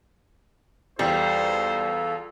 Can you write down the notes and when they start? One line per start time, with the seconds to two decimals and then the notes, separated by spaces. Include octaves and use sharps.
0.99 E2 G3 F4 A4 C5